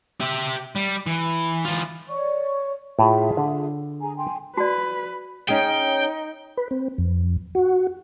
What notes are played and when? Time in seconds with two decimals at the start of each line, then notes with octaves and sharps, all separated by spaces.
0.20 G4 E5
0.76 G3
1.07 E3
1.65 E3 F4
2.09 C#5 D5 C#6
2.99 A2 F4 G#4 E5
3.37 D3
4.01 G#4 G#5 A#5
4.16 G5 G#5 C6
4.57 F#4 B4 D5
5.49 C#4 D#4 G#4 G5
6.57 B4
6.71 C4
6.98 F2
7.55 F#4